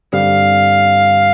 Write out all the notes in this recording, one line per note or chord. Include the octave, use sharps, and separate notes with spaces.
G2 D3 G3 C4 F5